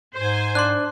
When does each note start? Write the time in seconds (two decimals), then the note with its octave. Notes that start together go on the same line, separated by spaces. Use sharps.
0.15 G#2 C5 G#5
0.55 D4 D5 C6 F#6